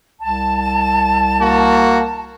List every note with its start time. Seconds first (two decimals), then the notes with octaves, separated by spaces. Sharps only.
0.21 C2 A5
1.41 A#3 F#4